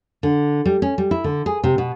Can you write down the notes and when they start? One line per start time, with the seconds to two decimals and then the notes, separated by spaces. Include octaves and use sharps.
0.23 D3
0.66 G3
0.82 C#4
0.98 G3
1.11 E4
1.24 D3
1.46 G#4
1.64 C3
1.78 B2